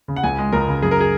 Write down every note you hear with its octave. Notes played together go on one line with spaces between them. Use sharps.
C#3
F#5
C#2 G#5
G#3
C#2 A#4
C#3
F#2 G#4
A#4
G#4